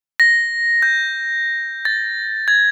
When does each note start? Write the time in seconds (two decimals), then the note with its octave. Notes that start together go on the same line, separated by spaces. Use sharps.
0.20 A#6
0.82 G6
1.85 A6
2.48 G#6